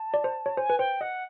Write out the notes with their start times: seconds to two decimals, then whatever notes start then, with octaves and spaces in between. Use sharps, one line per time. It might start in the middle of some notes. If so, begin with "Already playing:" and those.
Already playing: A5
0.14 D5
0.24 C5
0.46 C#5
0.57 C5 G#5
0.70 B4
0.78 C5 G5
1.01 D#5 F#5